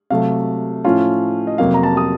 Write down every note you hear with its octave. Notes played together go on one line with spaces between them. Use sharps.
C3 F#3 A3 F5
A2 F3 A3 C#4 F4
D#5
F2 C3 F#3 A#3 F5
A#5
A5
D#6